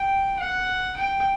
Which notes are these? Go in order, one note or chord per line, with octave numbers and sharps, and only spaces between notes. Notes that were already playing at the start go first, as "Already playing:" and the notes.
Already playing: G5
F#5
G5